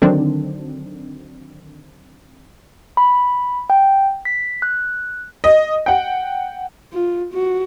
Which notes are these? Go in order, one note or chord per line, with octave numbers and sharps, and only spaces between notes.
D3 D#3 F#3 C4 D4
B5
G5
B6
F#6
D#5
F#5 G5
F4
F#4